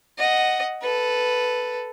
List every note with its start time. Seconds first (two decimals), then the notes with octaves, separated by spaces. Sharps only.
0.18 D#5 F#5
0.82 A4 B4